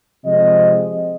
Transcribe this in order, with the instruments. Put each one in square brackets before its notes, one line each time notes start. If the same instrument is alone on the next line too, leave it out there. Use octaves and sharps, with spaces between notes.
[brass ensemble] C3 F3 G#3 C4 D#5